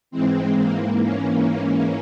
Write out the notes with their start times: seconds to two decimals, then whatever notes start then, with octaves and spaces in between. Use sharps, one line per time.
0.11 G#2 E3 G#3 C4
0.57 A#3
1.01 A#3 C#4